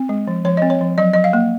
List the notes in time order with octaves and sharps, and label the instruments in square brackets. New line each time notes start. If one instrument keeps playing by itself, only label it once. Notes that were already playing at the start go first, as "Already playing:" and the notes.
Already playing: [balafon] C4
G#3
F3
F3 C#5
C4 D#5
C#5
F3
F#3 D#5
F#3 D#5
F5
A#3